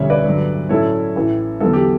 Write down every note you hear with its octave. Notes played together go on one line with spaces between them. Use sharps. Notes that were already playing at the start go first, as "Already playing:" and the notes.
Already playing: E1 D2 D3 G3 C#4 C#5 E5
B4 D5
G2 D3 F#3
A2 F#3 C#4 E4 A4 C#5
A1 A2 E3
E2 D3 F#3 B3 A4
G4